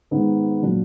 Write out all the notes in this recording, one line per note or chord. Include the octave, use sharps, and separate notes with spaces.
G#2 D#3 G#3 B3 D#4
A#2 F#3 A#3 D4